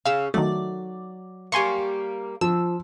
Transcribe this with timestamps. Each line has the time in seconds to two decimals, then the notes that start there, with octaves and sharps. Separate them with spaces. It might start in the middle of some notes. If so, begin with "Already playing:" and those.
0.06 C#3 C#4 F5 E6
0.34 D#3 F#3 A3 D5
1.52 G3 A#3 G#5 C6 C#6
2.41 F3 E6